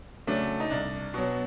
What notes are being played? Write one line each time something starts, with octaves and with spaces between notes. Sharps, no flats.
C#3 F#3 A3 D4
D#4
C2 D4
B2 F#3